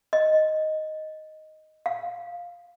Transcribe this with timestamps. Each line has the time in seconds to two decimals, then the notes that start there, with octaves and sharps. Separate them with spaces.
0.13 D#5
1.86 F5